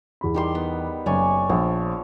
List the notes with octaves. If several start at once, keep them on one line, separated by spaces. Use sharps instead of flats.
E2 B5
D#3 G3 C6
B3
F#1 C#5 D5 G#5
A#1 F3